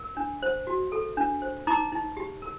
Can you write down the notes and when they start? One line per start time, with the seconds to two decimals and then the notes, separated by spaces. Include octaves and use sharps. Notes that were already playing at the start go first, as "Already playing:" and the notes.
Already playing: A#4
0.17 D4
0.43 C5
0.67 F#4
0.92 A4
1.17 D4
1.42 C5
1.67 D#4 A#5 D6
1.92 D#4
2.17 G4
2.42 A#4